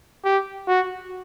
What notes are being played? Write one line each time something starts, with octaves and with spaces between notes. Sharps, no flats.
G4
F#4